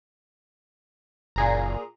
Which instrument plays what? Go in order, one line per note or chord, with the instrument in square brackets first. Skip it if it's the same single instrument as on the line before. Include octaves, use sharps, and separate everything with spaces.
[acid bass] F#1 [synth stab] A#2 G#4 A#5